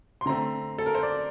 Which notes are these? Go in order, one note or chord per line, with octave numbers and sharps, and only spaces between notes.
C6
D3 A3 C4 A#5
A4
A#4
C5
D5